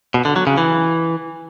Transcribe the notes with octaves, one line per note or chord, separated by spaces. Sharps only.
B2
D3
F#3
C#3
E3